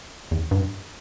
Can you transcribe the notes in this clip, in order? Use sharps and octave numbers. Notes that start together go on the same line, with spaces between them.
E2
G2